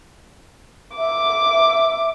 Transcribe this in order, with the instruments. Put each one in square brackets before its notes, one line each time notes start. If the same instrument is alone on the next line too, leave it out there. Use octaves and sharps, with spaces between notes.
[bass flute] E5 [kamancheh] D6